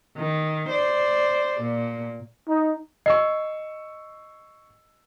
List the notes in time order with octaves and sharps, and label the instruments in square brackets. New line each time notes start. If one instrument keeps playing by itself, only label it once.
[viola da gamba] D#3
C5 D5
A#2
[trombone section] D#4
[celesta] D#5 [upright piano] C#6 E6 C7